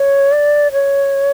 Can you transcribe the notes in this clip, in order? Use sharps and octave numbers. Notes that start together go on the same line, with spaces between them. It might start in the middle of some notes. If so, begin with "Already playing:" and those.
Already playing: C#5
D5
C#5